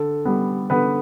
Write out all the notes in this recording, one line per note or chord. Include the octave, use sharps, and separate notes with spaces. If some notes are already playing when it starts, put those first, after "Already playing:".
Already playing: D3 A4
G3 B3
D3 B3 B4